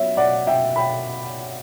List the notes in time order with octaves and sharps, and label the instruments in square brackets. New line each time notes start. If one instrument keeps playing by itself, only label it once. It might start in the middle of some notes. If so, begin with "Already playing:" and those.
Already playing: [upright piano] B2 F#3 C#5 E5
D5 F#5
E5 G5
G5 B5